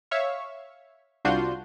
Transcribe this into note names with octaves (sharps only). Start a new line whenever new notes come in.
C#5 E5 F5 C#6
C2 D4 F4 F#4 C6 G6